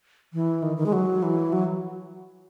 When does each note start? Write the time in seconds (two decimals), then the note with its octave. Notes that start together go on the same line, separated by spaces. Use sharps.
0.33 E3
0.63 D#3
0.78 D#3
0.86 G#3
0.93 F#3
1.23 E3
1.53 F#3